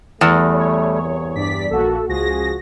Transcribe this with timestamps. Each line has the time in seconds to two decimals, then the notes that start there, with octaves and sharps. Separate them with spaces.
0.21 E2 G3 A3
0.53 C#5
1.02 C2
1.36 G2 D5 B6
1.70 A#1 A#3 F#4 A4
2.08 C#2 F3 F#4 G#4 A#6